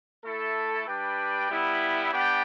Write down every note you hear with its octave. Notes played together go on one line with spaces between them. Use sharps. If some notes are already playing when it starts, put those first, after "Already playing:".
A3 E4 A4
G3 D4 B4 D5 G5
G3 B3 E4
B3 D4 G4 D5 G5